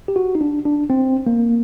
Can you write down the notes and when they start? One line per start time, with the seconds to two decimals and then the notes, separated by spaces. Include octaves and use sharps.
0.08 G4
0.16 F#4
0.35 D#4
0.41 D4
0.65 D4
0.90 C4
1.27 A#3